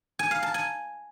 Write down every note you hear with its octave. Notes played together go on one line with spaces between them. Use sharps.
G#5
F5
A5
G#5